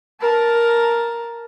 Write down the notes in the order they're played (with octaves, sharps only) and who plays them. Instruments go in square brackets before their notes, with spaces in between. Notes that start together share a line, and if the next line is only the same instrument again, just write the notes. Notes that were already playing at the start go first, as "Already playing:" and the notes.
[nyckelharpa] A#4 A5